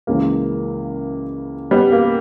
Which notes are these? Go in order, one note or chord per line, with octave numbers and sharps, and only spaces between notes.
C#2 C#3 E3 A#3
G3 B3
A#3